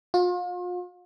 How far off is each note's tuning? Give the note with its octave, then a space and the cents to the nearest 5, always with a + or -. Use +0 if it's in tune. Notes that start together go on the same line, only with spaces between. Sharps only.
F4 +40